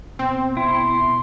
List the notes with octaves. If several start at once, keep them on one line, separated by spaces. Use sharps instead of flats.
B2 C4
E4 C6